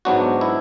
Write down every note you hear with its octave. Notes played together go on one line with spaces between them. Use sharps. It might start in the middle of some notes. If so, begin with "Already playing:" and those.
G#2 F#3 B3 D4 F#4
E4